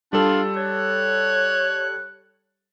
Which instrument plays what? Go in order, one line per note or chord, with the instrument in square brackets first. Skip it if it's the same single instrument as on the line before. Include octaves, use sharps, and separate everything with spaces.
[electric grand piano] G3 A4 [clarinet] D4 [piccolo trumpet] F4
[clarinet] C#5 [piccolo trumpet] F#6